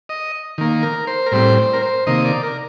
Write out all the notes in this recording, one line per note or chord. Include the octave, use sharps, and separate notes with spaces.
D#5
D#3 A#3
A#4
C5
A#4
A2 G3 C4 C5
C5
A#4
C5
C3 D#3 A#3 D#5
D5
A#4